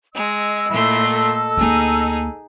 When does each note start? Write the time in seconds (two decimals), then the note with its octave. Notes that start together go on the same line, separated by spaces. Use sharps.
0.14 G#3 D#5 E6
0.70 A#2 A3 E4 C6
1.14 A4
1.57 D2 A#3 D#4 G#4